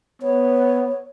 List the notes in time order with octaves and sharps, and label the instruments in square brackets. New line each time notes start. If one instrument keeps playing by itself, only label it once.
[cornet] B3 [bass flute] C#5